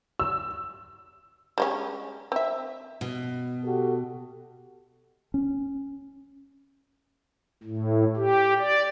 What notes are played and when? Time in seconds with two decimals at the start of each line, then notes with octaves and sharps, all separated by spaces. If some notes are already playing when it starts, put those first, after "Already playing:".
0.20 E6
1.58 G3 G#3 C#4
2.32 C4 E5
3.01 B2
3.64 F#4 G4 A4
5.34 C#4
7.63 A2
8.16 G4
8.59 D5